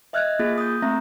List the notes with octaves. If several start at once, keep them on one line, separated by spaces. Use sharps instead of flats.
D#5 E5 F6 F#6 G#6
A#3 F4 G#4 A6
D#6 G6
A3 C4 E5 A#5 A#6